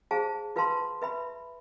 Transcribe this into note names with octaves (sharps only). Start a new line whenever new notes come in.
G#4 C5 F5 A5
F4 B4 F5 A5 C6
B4 E5 B5